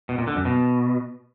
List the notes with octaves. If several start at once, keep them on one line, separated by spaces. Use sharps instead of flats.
B2
A#2
D3
F#2
B2